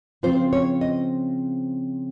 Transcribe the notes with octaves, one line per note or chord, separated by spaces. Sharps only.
C#3 F3 C4 F4 C5
C#5
D#5